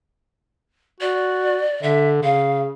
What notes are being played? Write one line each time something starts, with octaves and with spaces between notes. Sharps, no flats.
F#4 D5
D3 E5
C#3 F5